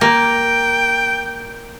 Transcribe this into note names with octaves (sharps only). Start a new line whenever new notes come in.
A#3 G5